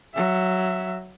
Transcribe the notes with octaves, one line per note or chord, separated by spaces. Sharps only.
F#3 E5